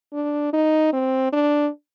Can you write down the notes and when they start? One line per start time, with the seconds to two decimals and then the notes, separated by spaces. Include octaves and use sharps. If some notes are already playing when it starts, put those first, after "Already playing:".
0.13 D4
0.53 D#4
0.93 C4
1.32 D4